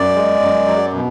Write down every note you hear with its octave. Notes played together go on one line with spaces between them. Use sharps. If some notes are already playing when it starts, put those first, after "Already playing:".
Already playing: F#2 D5
G#3
F#2
F#3
B2